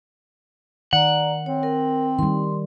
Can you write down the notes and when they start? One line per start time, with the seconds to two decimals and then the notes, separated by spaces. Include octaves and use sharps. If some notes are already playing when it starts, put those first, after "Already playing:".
0.93 D#3 D5 F#5 A#5
1.46 C4 C#5
1.63 A#4
2.19 D#3 G3 C6